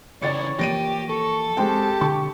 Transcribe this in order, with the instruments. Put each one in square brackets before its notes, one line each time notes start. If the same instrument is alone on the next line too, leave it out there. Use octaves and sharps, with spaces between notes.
[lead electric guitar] C#3 E3 [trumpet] C#5 [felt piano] D5 A6 C#7
[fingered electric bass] E3 F3 A#3 [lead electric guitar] G4 [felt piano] A#6 D7 D#7
[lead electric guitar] A4 [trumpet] C#6
[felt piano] G#3 C4 G5 [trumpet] G4
[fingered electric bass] B2 D3 [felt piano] C#6